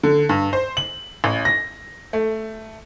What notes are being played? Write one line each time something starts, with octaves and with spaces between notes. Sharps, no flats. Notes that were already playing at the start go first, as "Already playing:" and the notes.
D3
G2
C5
F#7
A1
A#6
A3